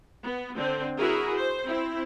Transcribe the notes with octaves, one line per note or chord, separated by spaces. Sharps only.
B3
D3 C4
E4 F#4 G#4 A#4
C5
C4 E4